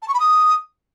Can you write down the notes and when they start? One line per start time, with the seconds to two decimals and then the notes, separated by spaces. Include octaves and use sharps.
0.02 A5
0.08 C#6
0.14 B5
0.20 D#6